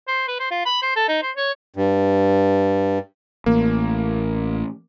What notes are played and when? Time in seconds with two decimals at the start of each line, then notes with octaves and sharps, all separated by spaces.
0.08 C5
0.28 B4
0.40 C5
0.51 F4
0.66 B5
0.83 C5
0.96 A4
1.09 D#4
1.23 C5
1.36 C#5
1.76 G2
3.46 A1 A#3